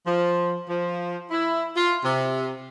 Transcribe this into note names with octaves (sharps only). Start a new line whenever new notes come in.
F3
F3
E4
F4
C3